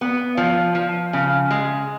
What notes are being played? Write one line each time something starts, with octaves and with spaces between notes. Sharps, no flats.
B3
F3
F3
C#3
G#3